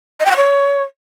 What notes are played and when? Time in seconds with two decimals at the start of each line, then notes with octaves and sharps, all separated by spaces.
0.20 D#5
0.25 G5
0.31 F#5
0.36 C#5